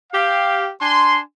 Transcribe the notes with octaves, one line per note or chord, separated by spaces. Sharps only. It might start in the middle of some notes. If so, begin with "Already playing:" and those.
G4 F5
D4 G#5 C6